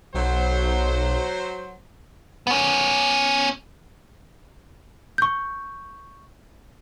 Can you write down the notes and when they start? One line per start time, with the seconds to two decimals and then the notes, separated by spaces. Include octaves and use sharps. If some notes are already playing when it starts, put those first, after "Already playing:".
0.15 B1 F#3 C5
2.47 B3 C#4
5.18 C#6 G6